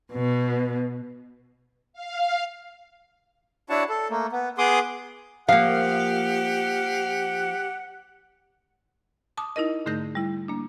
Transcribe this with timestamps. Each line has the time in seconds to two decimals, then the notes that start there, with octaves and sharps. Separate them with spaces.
0.13 B2
1.93 F5
3.70 D4 E4 F#4 C#5 F#5 A5
3.89 A4
4.10 A3 A#3
4.33 B3
4.58 B3 G#4 C6 D6 D#6
5.49 F3 A#3 G4 F5 F#5
9.37 A5 D6 D#6
9.56 D#4 E4 A#4 D#5
9.86 G#2 D3 A3 D#4 G6 A#6
10.15 G3 E4
10.48 A#3 D4